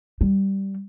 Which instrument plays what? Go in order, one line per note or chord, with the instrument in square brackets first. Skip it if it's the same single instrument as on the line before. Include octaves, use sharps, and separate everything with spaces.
[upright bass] G3